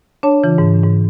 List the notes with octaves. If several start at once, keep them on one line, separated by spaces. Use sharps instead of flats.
D4 C#5 A5
C#3 E3 F4
G#2
G#2